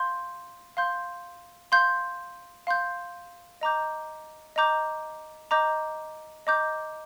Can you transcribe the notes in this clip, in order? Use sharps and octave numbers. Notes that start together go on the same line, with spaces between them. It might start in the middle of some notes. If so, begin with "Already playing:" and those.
Already playing: F5 C6 G6
F5 C6 G6
F5 C6 G6
F5 C6 G6
D#5 A#5 D6 G6
D#5 A#5 D6 G6
D#5 A#5 D6 G6
D#5 A#5 D6 G6